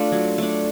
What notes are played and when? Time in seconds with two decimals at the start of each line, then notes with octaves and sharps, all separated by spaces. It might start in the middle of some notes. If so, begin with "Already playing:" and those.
Already playing: A3 D4 F4
0.12 F#3
0.38 A3 D4